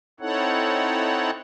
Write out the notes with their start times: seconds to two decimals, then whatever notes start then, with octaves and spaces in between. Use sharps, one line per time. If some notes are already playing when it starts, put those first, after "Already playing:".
0.20 C4 D#4 E4 A4 C#5 F#5